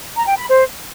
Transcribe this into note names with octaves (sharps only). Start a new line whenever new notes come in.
A#5
G5
B5
C5